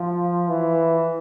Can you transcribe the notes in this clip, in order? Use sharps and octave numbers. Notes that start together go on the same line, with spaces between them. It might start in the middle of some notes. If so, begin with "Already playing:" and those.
Already playing: F3
E3